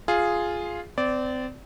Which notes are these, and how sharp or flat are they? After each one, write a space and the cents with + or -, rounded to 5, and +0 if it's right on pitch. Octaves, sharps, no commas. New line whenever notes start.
F4 +0 G#4 +0
C4 -30 D5 -15